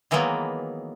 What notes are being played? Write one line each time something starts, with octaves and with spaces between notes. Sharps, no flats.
D#3 E3 F#3 G#3 A#3 B3